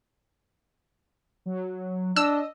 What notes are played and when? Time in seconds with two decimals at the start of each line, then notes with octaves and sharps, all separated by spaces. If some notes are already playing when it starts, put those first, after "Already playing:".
1.46 F#3
2.16 D4 D#5 E6